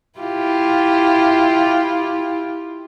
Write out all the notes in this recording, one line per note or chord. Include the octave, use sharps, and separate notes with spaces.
E4 F4 G4